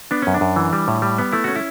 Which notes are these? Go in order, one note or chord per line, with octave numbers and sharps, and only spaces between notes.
B3 D4
F#2 C#4
D4
F#2
E3
G3
A2
G3
B3
A3 E4
C#4 F#4
E4